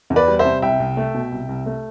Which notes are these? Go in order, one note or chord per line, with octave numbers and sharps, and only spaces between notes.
E2
B4 D5
G3
C5 E5
C3
C2 E5 G5
C2
A3
B2
C2
C2
A3